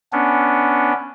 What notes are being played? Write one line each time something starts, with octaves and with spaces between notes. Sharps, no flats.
B3 C#4 D4